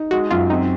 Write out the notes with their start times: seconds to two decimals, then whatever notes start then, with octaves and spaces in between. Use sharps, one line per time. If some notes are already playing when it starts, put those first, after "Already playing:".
Already playing: D#4
0.11 G#3 F#4
0.31 F#2 F4
0.50 C4 D#4